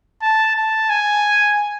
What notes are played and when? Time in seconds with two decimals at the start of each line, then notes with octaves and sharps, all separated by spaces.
0.22 A5
0.56 A5
0.90 G#5